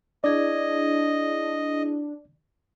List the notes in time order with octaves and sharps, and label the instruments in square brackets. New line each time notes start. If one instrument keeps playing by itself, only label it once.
[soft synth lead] D4 [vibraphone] E4 G#4 [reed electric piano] D5 [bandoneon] D#5